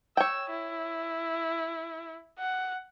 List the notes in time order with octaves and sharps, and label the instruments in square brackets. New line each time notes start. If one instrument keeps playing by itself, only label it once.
[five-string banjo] C#5 G5 [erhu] E6
[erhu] E4
F#5